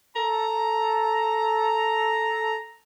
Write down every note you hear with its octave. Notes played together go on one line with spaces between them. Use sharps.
A4 A#5